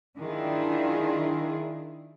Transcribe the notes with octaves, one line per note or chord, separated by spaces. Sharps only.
D#3 D4 E4 F4 G#4